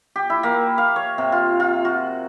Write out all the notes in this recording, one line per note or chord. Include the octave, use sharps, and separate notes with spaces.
G4
E4
A#3
F5
C#5
C3
F4
F4
F#4